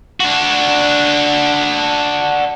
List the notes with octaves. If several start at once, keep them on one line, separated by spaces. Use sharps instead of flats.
D4 F#4